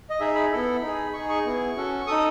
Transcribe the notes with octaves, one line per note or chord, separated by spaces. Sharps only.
D#5
D#4 G#4 E5
B5
B3 E4 A4
D#4
G#4
D#4 G#4 C#6
C#6
B3 E4 G#4
C#4 F#4 A4
D#4 A4 D#6